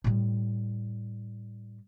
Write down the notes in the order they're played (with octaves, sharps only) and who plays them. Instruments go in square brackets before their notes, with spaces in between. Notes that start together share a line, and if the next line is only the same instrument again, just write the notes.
[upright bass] A2 G3